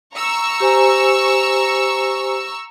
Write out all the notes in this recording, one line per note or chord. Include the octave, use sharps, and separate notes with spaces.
A#5 C#6 E6
G4 C5 G#5